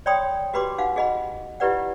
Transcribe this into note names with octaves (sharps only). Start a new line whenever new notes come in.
C#5 D5 G5 B5 C6 D#6
F#4 G4 B4 B5 C6 D6
D#4 F#4 F5 F#5
F#4 G#4 D#5 F#5 B5
E4 F4 G4 B4 D5 F#5